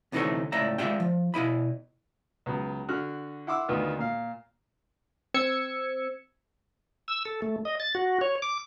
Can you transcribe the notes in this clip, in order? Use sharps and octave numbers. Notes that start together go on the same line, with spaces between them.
D2 C3 E3 D#4 A4 C#5
C#2 A2 D5 E5 A#5
G#3 F4 D5 E5 G5
F3
B2 E4 D#5 B5
C#2 F#3 B3
D3 F#4 F6 F#6
E4 F#5 C6 D6 E6
D2 D#3 B3 F4 B4
A#2 F5
C4 E6 G#6 C#7
E6
A4
A3
D#5
A6
F#4
C#5
D6